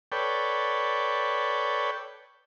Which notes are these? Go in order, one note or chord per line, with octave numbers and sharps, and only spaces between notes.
A4 B4 C#5 D5 G5